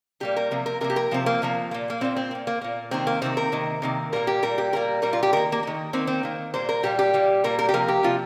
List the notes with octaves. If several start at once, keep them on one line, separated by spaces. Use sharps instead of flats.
A#2 G3 A#3 G4
A#4
C3 F3 A#3
A#4
C3 F3 A#3 A#4
G4
A#4
C3 F3 A#3 C4
A#3
C3 F3 A#3
A#2 A#3
A#3
A#2 A#3 C4
C4
A#2 A#3
A#3
A#2 A#3
C3 D#3 A#3 C4
A#3
C3 D#3 A#3 C4
A#4
C3 D#3 A#3
C3 D#3 A#3
A#2 G3 A#3 A#4
G4
A#2 G3 A#3 A#4
G4
A#2 G3 A#3 A#4
A#2 G3 A#3 A#4
F4
G4
D#3 A#3 A#4
A#3
D#3 A#3
D#3 A#3 C4
C4
D#3 A#3
A#2 G3 A#3 C5
A#4
A#2 G3 A#3 G4
G4
A#2 G3 A#3
A#2 G3 A#3 A#4
A#4
G4
C3 F3 A#3 A#4
G4
C3 F3 A#3 F4